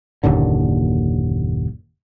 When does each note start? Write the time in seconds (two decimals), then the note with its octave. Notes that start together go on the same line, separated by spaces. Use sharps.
0.23 F#1 D#2 A#2 D3